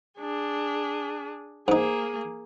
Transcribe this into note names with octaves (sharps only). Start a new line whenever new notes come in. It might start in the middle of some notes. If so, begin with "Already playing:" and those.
D4 G#4
G#2 A#3 D#4 G#4